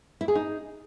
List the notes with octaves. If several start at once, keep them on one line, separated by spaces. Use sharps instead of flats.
E4
G#4
D#4